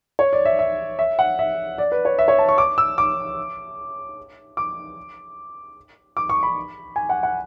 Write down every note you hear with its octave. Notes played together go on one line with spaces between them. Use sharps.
C#5
D5
E5
E5
E5
F#5
E5
D5
B4
C#5
E5
C#5
A5
C#6
D6
E6
D6
D6
D6
C#6
B5
G#5
F#5
F#5